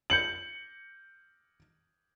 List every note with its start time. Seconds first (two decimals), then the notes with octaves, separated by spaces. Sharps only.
0.10 G6 C#7 F#7